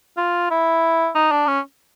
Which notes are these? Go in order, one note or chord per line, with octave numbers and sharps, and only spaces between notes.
F4
E4
D#4
D4
C#4